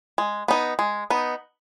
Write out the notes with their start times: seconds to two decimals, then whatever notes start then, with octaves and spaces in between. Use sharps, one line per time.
0.18 G#3
0.48 B3 D#4
0.79 G#3
1.10 B3 D#4